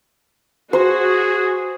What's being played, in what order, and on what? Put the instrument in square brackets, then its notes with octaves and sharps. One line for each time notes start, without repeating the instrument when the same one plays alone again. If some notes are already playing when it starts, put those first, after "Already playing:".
[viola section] F#4 [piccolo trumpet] G#4 [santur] C5